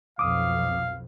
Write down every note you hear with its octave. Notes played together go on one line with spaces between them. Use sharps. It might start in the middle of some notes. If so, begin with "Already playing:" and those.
B1 F2 F5 D6 D#6